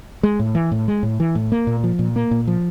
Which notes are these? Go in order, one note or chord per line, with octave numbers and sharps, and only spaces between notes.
G#3
A2
E3
A2
G#3
A2
E3
A2
A#3
A#2
F3
A#2
A#3
A#2
F3